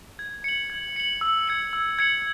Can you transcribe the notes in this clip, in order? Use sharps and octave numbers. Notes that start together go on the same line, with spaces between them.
G#6
C#7 F#7
G#6
C#7 F#7
E6
G#6 C#7 F#7
E6
G#6 C#7 F#7